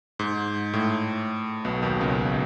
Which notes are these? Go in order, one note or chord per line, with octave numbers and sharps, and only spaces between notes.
G#2
A2
B1 B2
D#2 D#3
C#2 C#3